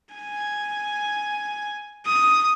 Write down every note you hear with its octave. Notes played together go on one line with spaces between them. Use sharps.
G#5
D#6